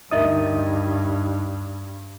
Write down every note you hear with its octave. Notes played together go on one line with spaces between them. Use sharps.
D2 G2 D#4 A#4 D#5 E5 D#6